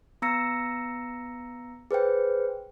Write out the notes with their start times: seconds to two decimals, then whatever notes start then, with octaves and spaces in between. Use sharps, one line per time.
0.22 B3 A#5 E6 A#6 C#7
1.91 G#4 B4 C5 G5